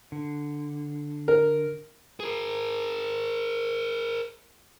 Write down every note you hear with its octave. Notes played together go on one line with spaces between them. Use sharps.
D3
A#4
G#4 A#4